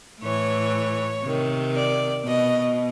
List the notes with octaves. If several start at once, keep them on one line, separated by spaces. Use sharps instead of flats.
A2 E3 C#5
C3 D#3
D5
B2 D#5